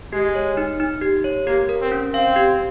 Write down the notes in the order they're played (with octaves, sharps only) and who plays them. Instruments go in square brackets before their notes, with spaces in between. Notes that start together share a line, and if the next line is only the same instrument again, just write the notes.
[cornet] G#3 [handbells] G4
[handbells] C#5
D#4
D#4
G4
C#5
[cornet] A#3 [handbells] G4
[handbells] A#4
[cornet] C4
[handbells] C#4
[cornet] C4 [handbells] F5
[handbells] G4